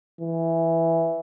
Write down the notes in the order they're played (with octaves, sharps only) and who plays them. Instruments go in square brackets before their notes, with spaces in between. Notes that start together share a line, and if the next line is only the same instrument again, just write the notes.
[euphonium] E3